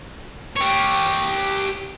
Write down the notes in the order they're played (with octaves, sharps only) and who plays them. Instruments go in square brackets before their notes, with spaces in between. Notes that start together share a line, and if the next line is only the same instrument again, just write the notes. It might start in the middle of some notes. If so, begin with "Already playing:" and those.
[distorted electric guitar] G4 C#5